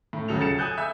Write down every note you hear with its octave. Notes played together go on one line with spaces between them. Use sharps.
A2
D#1 C#3 F#3 A4 F7
A6 C#7 E7
G#5 D#6 F#6 G6
E5 E6 G6